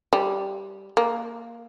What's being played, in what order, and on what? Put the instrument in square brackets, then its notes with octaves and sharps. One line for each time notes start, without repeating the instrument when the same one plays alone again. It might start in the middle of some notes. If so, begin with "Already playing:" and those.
[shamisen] G3
A#3